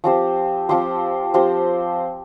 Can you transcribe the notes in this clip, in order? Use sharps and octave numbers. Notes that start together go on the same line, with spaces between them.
F3 C4 G4 C5
F3 C4 G4 C5
F3 C4 G4 C5